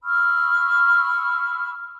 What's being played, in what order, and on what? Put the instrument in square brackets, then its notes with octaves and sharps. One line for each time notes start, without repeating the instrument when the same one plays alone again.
[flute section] B5 C#6 E6 F6